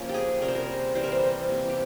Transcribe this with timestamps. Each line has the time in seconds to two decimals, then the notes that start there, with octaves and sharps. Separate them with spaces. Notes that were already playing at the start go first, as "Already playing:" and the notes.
Already playing: F3 A#3 C#4
0.09 G4 G#4
0.41 C3 G3 C#4 A#4
0.48 C5
0.55 A#4
0.95 E3 G3 C4 C5
1.04 A#4
1.12 C5
1.23 C5
1.49 C3 E3 A#3
1.69 G4